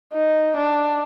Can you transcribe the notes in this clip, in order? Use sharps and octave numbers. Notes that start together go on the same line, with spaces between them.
D#4
D4